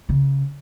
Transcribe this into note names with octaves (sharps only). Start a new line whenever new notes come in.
C#3